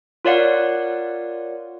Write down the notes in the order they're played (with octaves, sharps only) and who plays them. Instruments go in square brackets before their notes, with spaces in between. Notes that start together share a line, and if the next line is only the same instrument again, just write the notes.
[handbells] F4 A#4 C#5 D5 F5 F#5